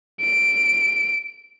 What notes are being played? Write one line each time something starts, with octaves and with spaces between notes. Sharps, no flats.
D7